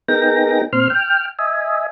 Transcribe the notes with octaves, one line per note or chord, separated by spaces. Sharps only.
B3 D#4 G#4 A#4 G5 A#6
A#2 C4 C6 F6
G5 F6
D#5 E5 G#5